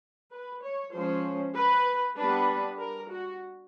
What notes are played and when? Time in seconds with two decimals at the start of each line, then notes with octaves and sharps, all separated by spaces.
0.31 B4
0.62 C#5
0.92 F3 G#3 C#4 C5
1.55 B4
2.16 G3 B3 D4 B4
2.79 A#4
3.10 F#4